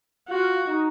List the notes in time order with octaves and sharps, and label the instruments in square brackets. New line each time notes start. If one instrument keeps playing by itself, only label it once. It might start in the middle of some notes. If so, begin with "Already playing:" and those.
[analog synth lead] F4 [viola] F#4
[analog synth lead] D#4